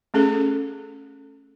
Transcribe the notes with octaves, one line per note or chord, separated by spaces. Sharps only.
A3 C#4 G#4 A4